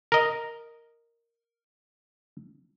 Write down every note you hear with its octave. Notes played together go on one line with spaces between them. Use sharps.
A#4 D#5